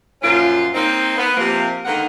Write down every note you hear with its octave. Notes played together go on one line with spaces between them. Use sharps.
F#2 A#2 F3 C#4 F4
A#3 C4 D#4
B3
C3 F3 A#3
D3 D#3 G#3 A#3 B3 F#5